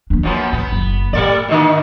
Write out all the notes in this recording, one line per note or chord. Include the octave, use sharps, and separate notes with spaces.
A#3 D4
F#2 F3 B3
A1 B3
F#1
A2 G3 A3 D5
B2 D3 A#3